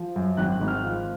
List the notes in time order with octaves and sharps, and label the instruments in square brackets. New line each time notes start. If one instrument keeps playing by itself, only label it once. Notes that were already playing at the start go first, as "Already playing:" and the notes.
Already playing: [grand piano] F3
F#2
G#1 F#6
G#1
F6
F3